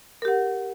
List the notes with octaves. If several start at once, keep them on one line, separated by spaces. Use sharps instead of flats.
G4 A#4 F#5